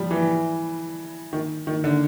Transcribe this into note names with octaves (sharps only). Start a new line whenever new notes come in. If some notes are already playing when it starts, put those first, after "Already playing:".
Already playing: F3 G3
E3
D#3
D#3
D3